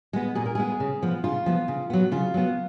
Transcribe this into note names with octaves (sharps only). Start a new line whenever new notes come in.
G#3 B3
A#2 G#4
A#4
G#3 B3 G#4
C#3
F3 B3
C#3 F4
F3 B3
C#3
F#3 B3
C#3 F4
F#3 B3